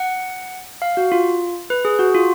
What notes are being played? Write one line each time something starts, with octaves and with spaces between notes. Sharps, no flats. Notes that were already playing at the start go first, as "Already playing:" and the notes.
Already playing: F#5
F5
F#4
F4
B4
G#4
F#4
F4